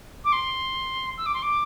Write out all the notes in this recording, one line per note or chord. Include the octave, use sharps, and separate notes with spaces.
D6
C6
E6
D6
C6
D6